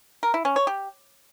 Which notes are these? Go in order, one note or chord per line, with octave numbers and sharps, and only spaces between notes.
A#4
E4
C#4
C#5
G4